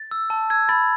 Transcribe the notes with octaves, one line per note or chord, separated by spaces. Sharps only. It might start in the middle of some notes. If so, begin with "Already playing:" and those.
Already playing: A6
E6
A5
E6 G#6
B5 A6